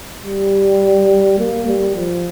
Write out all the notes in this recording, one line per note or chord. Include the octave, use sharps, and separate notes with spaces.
G3
A#3
G3
F3